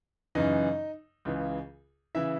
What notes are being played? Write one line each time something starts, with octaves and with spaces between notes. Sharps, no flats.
F#2 C#3 E3 D#4 D#5
C#2 C#3 E3
C#3 E3 E4 E5